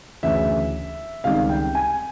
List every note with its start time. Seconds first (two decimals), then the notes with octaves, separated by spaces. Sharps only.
0.23 D2 C#3 E3 E5
1.24 C#2 C3 D#3 G3 F5
1.49 G5
1.75 G#5